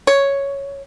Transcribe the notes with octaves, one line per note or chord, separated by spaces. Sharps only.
C#5